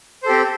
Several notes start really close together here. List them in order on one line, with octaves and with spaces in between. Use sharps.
C5 A4 G4 C4